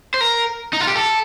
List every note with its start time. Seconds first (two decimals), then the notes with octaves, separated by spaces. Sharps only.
0.14 C5
0.21 A#4
0.73 D#4
0.81 F4
0.87 G4
0.95 A4